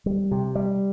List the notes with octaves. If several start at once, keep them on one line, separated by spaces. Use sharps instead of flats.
G3
C3
G3